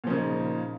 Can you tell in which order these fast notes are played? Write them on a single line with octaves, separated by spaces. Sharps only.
A#2 F3 C#3 A#3 D#4